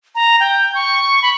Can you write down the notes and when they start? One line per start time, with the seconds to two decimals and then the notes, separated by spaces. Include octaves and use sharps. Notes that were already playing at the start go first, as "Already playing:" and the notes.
0.15 A#5
0.40 G5
0.75 C#6
1.22 B5